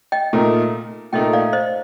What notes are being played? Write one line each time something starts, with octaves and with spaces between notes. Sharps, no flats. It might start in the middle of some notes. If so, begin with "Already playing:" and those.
D#5 G5
A#2 A3 D#4 A#4
A#2 A3 D#4 A#4 D#5 G5
D5 F5
C5 D#5